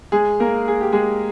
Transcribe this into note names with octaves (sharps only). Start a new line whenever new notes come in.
G#3 G#4
A#3 A#4
G#4
G4
G#3 G#4